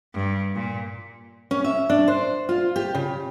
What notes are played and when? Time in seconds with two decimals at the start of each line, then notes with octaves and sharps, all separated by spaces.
0.13 G2
0.54 A#2
1.51 C#4
1.64 E5
1.90 D4
2.08 C5
2.49 F4
2.76 G4
2.95 C#3